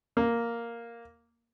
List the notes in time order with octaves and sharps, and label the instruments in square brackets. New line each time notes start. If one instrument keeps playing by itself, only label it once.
[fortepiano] A#3